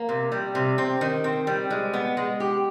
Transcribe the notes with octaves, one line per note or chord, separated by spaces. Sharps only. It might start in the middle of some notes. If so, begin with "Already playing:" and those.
Already playing: A#3
C3
G3
C3
C4
D#3
C4
G3
G#3
B3
G#3
G4